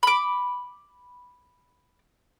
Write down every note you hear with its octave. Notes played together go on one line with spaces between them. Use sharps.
B5 D6